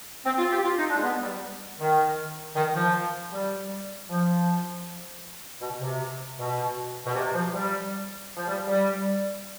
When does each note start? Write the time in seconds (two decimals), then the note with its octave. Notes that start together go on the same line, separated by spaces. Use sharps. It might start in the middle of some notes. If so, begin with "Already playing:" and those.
0.26 C4
0.38 F4
0.51 G4
0.63 F4
0.77 D#4
0.89 D4
0.96 G#3
1.02 B3
1.22 G3
1.79 D#3
2.56 D#3
2.74 F3
3.32 G3
4.08 F3
5.61 B2
5.80 C3
6.38 B2
7.05 B2
7.14 C3
7.34 F3
7.52 G3
8.36 F3
8.48 G3
8.67 G3